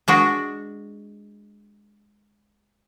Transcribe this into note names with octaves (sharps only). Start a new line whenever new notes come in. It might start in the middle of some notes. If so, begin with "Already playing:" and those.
G#3 D4 F#4